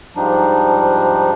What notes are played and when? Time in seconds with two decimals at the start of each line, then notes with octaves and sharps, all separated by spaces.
0.16 G#2 F3 G3 D4 D#4